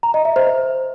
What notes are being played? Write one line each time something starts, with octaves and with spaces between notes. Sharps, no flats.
A#5
D#5
E5
C5
C5